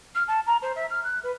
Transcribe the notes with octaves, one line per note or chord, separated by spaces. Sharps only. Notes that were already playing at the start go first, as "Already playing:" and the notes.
F6
A5
A#5
C5
E5
F6
F#6
B4